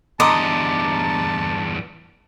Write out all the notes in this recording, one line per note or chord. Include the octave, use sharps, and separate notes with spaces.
E2 G2 D#5 A5 A#5 C6 D6